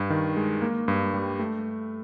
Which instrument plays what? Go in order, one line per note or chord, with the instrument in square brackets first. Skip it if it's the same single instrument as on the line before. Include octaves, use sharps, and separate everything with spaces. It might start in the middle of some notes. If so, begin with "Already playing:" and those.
Already playing: [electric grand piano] G2
D#3
G#3
A#3
G2
G3
A3